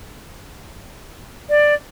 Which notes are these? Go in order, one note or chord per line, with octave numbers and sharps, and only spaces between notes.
D5